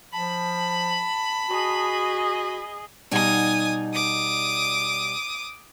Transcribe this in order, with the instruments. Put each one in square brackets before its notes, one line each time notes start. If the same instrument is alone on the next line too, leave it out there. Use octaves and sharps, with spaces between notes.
[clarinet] F3 [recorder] A5 [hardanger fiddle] B5
[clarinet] F#4 [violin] G#4 D#5
[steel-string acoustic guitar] B2 G3 D#4 [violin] G#5 D#6
[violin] D6 D#6